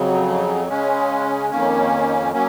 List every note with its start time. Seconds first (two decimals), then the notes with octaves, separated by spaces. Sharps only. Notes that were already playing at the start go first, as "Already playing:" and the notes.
Already playing: F2 C#3 F#3
0.68 C#3 G#3 C#4
1.50 F2 D#3 A#3 C#4
2.33 F#3 A#3 C#4